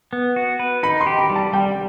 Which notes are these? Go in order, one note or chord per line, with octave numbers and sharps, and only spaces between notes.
B3
F#4
B4
D#4 B5
C6
G4
B5
G3
A5
G3 G5